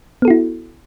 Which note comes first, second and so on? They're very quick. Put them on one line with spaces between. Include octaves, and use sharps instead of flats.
B3 A4 F#4 E4